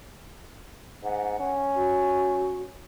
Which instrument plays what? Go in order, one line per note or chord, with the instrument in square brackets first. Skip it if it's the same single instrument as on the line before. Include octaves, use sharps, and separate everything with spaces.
[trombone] G#2 [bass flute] F#5
[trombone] C#4
[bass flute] F#4